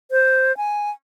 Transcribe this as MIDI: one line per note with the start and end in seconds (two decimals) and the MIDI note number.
0.11 0.55 72
0.57 0.90 80